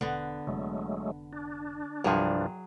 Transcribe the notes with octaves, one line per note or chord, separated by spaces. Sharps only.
E1 D3 B3
F1 F#3 G#3 A3
D4
C2 G2 F3 F#3 G#4